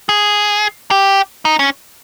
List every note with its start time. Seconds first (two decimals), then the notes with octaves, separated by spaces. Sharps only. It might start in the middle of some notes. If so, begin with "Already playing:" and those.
0.09 G#4
0.91 G4
1.45 D#4
1.59 C#4